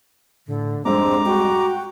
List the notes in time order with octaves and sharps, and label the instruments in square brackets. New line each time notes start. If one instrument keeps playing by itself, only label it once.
[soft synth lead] A2 [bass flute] D3
[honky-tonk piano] C2 F2 G#2 [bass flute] C4 [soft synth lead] D4 [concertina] A#5 D6
[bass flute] F#4 [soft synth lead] G5